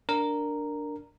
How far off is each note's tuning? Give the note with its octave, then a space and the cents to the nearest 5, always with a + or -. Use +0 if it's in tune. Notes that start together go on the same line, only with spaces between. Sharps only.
D4 +0 A#4 -5